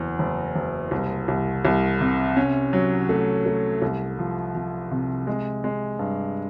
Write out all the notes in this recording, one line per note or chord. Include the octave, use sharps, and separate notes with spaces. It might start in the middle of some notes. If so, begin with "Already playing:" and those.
Already playing: F#1 E2
F#1
F#1
C2
C2
C2
C3
C#4
F#3
A3
A3
C2
F3
F3
C3
G#3
G#3
G2